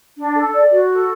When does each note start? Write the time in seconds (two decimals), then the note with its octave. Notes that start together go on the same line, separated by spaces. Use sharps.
0.18 D4
0.36 A4
0.54 D5
0.71 F#4
0.91 A4